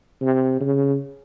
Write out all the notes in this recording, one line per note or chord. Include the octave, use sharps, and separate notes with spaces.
C3
C#3